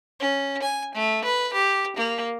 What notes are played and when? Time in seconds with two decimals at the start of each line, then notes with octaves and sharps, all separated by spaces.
0.20 C#4
0.62 G#5
0.95 A3
1.24 B4
1.53 G4
1.96 A#3